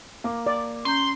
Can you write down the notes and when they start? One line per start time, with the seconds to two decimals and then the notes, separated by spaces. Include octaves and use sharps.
0.24 A#3 D6
0.46 D5
0.85 C#4 A#5 C6 G6